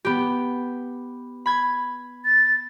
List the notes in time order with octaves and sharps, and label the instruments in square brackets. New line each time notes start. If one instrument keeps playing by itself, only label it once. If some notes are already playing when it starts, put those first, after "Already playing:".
[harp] B3 G4
B5 G#6
[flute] A6